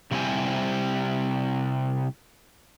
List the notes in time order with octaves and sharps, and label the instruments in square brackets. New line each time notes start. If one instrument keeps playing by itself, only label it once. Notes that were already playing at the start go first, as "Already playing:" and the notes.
[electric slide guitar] C3 G3 C4 E4 C5 G#5